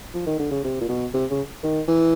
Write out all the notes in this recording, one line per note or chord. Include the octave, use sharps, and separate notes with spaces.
F3
D#3
D3
C#3
C3
A#2
B2
C3
C#3
D#3
E3